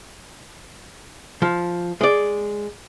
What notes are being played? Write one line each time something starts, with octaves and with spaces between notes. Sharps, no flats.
F3
G#3 D5